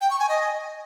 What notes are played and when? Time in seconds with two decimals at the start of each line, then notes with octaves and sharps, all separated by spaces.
0.01 G5
0.10 C#6
0.20 G#5
0.29 D#5